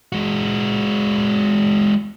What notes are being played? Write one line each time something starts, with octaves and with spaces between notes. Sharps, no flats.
G#3 F#4